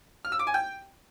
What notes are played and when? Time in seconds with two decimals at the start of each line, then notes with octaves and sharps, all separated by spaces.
0.25 F6
0.32 E6
0.39 D6
0.47 G#5
0.54 G5